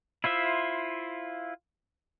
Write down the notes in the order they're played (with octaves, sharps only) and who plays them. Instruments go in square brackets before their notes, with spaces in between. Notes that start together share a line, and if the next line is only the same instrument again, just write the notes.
[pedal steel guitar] E4 F4 C5 E5